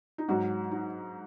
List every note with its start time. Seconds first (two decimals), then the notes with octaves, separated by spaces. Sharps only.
0.18 D#4
0.28 G#2 F#3 F#4
0.71 D#4